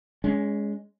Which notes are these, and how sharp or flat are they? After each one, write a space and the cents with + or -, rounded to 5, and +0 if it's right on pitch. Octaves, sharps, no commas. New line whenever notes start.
G#3 +0 C#4 +25